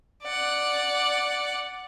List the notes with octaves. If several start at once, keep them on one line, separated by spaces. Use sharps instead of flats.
D5 F#5